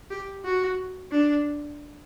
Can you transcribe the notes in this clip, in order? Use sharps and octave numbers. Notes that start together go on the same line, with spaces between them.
G4
F#4
D4